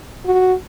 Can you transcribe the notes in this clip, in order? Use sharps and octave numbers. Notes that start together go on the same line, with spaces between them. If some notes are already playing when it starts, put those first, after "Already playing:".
F#4